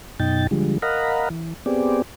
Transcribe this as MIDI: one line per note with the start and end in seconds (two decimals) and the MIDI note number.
0.20 0.47 42
0.20 0.47 47
0.20 0.47 63
0.20 0.47 79
0.20 0.47 93
0.51 0.78 50
0.51 0.78 53
0.51 0.78 55
0.51 0.78 56
0.82 1.29 70
0.82 1.29 75
0.82 1.29 77
0.82 1.29 78
0.82 1.29 82
0.82 1.29 83
1.30 1.54 52
1.66 2.02 59
1.66 2.02 60
1.66 2.02 67
1.66 2.02 68
1.66 2.02 74